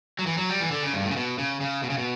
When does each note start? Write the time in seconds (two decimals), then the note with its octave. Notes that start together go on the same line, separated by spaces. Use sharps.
0.19 F#3
0.26 E3
0.37 F#3
0.49 G3
0.60 E3
0.71 D3
0.82 C#3
0.93 G2
1.04 A2
1.11 C#3
1.16 B2
1.38 C#3
1.61 C#3
1.83 B2
1.90 C#3
1.98 B2